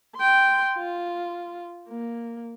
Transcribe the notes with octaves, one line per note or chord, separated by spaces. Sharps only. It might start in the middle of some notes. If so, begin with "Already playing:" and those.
G5 C6
F4
A#3